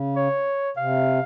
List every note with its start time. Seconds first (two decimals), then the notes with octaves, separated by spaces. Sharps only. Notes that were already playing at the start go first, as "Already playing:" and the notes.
Already playing: C#3
0.16 C#5
0.77 C3 F5